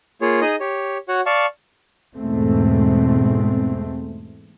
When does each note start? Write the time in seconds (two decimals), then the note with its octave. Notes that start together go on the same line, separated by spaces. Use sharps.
0.22 A#3 F4 G#4 C#5
0.41 D#4 G#4 D#5 D#6
0.60 G4 C#5
1.08 F#4 C#5 F#5
1.26 D5 F5 A5 C#6
2.17 E2 G#2 B2 G#3 A3 C4